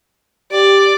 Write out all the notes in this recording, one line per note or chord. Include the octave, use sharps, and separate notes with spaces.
G4 D5